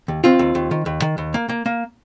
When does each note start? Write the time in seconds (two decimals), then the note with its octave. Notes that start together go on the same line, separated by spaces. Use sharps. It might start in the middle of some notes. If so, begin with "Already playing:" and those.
0.08 D#2
0.24 D#2 C4 F4
0.39 D#2
0.55 D#2
0.71 D#3
0.86 D#2
1.02 D#3
1.18 D#2
1.34 A#3
1.49 A#3
1.66 A#3